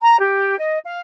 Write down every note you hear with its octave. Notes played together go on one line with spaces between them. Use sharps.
A#5
G4
D#5
F5